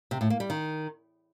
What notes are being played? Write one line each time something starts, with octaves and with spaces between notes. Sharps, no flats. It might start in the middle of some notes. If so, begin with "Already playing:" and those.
C3
A2
A#3
G3
D#3